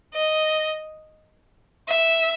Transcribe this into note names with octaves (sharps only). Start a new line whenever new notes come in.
D#5
E5